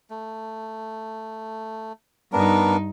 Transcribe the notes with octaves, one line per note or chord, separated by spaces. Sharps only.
A3
G2 B3 D4 D#4 A#4